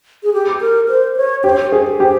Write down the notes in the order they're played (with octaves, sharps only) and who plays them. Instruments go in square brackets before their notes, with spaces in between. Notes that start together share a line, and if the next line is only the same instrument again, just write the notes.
[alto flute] G#4
G4
A#4
C5
C#5
[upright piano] G4 [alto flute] C5
[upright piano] G#4
[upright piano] G4 [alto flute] C5